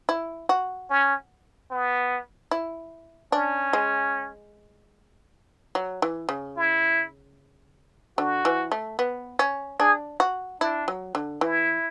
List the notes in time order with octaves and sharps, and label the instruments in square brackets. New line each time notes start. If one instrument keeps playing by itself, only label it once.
[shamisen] E4
F#4
[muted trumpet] C#4
B3
[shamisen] E4
[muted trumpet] C#4 [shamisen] D4
[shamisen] G#3
F#3
E3
C#3
[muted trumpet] E4
[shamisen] D3 [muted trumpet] F#4
[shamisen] E3
A3
B3
C#4
[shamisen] D4 [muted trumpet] G#4
[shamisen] F#4
[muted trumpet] D4 [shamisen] E4
[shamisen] F#3
D3
[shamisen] E3 [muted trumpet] E4